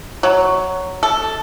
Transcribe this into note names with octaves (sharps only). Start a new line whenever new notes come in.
F#3
A4